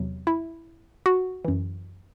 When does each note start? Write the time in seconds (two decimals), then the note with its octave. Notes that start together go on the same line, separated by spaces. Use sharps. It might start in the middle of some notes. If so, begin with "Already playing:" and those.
Already playing: E2 C3 F#3
0.27 E4
1.06 F#4
1.45 F#2 E3